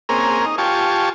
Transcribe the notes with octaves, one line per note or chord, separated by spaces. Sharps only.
A#3 C4 C#4 G#4 A#4
D#4
F4 G4 G#5 A5 C#6